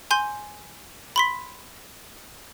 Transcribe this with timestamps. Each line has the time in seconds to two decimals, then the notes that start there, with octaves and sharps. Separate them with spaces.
0.11 G#5 C6 G6
1.16 B5 C6 B6